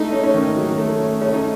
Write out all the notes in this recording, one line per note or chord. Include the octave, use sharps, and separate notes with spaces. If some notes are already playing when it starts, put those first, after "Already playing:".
Already playing: A3 D#4
C#4
C#4
D#3
F#3
A3
C#4
A3 C#4
D#4